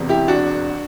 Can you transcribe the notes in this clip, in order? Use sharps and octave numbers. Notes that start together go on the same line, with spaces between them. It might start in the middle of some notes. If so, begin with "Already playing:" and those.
Already playing: E1 E2 C3
E4 G4
D4 F#4